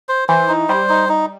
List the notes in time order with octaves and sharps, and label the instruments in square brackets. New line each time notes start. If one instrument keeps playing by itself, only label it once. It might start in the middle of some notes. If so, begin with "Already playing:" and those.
[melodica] C5
[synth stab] E3 [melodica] C5
[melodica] D#4
[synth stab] G3 [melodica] C5
[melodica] D#4
D#4